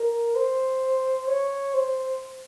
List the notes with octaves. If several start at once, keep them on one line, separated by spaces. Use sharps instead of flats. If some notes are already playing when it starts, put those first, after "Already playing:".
Already playing: A#4
C5
C#5
C5